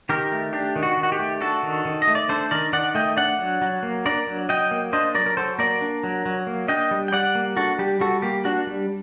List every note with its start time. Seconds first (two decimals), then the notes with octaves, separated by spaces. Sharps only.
0.09 D#3 G4 A#4
0.32 A3
0.53 D4 G4
0.76 D#3
0.83 F#4
0.97 D#3
1.03 F#4
1.12 G4
1.19 A3
1.41 D4 F#4 A4
1.63 D#3
1.85 D#3
2.02 D#5
2.07 A3
2.15 D5
2.29 D4 A4 C5
2.51 D#3 A#4 D5
2.73 D#3 D5 F#5
2.95 A3 D#5 G5
3.17 D4 D5 F#5
3.39 F#3
3.62 F#3
3.83 A#3
4.05 D4 A#4 D5
4.27 F#3
4.49 F#3 D#5 G5
4.71 A#3
4.93 D4 C5 D#5
5.15 F#3 A#4 D5
5.26 A#4
5.37 F#3 A4 C5
5.59 A#3 A#4 D5
5.81 D4
6.03 F#3
6.26 F#3
6.47 A#3
6.68 D4 D#5 G5
6.91 G3
7.08 G5
7.13 G3 D5 F#5
7.35 A#3
7.57 D4 F#4 A4
7.79 G3 G4
8.00 G3 F#4 A4
8.22 A#3 G4
8.45 D4 F#4
8.67 G3